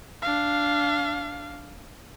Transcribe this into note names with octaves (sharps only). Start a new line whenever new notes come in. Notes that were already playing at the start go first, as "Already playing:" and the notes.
D4 F5